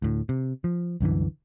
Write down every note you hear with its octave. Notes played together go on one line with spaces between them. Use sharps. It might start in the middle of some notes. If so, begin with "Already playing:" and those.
D2 A2
C3
F3
C2 F#2 D3 E3